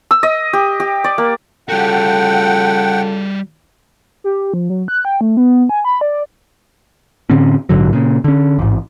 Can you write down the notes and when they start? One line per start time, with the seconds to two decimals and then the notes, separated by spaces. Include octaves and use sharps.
0.11 E6
0.23 D#5
0.53 G4
0.80 G4
1.04 D5
1.18 A#3
1.69 C#3 G3 F4 F#4 A4 F#5 G5
4.24 G4
4.54 F3
4.70 F#3
4.88 F#6
5.05 G5
5.21 A3
5.37 B3
5.69 G#5
5.85 B5
6.01 D5
7.30 A2 D3 C4 C#4
7.69 A#1 G#2 D3 F#3
7.93 A#2 C#3
8.24 D3 C#4
8.59 A1 G#2